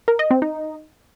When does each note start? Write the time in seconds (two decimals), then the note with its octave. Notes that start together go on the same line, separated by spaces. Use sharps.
0.08 A#4
0.19 D#5
0.31 C4
0.42 D#4